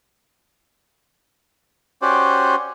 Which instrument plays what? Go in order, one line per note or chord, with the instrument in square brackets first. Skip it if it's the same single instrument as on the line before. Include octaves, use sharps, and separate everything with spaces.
[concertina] C#4 F#4 G4 C5 D5